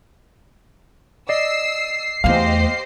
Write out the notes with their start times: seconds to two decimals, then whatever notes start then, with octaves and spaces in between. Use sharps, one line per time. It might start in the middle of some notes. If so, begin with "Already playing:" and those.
1.29 D5 D#5 E6 C7
2.24 E2 A3 G4 C5 D#5 F5